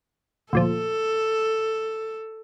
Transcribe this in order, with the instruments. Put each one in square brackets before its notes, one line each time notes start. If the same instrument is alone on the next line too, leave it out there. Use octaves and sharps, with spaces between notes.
[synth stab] D2 A#2 F3 [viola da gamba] A4